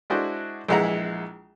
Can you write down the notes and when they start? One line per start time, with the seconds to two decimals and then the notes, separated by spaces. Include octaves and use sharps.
0.10 G#3 D4 E4 F#4 C5 D#5
0.69 A#1 E3 G#3 E4 F#5 A#5